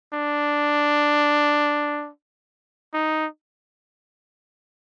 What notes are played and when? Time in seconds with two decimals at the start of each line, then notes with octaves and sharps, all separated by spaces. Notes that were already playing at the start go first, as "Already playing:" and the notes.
0.13 D4
2.94 D#4